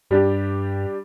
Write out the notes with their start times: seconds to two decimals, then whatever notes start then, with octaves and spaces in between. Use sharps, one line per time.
0.10 G2 G3 D4 G4